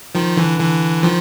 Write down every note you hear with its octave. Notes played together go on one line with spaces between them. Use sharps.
D#3 F3
D3 E3
D3 E3
D#3 F3